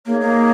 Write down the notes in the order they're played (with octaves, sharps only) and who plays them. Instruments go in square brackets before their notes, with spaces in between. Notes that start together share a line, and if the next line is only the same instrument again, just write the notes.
[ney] A#3 [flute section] D#4 G#4 C#5
[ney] A#3